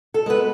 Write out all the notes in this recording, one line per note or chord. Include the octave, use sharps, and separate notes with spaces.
A4
G#3 B3 B4